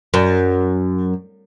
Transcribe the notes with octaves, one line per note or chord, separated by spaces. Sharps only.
F#2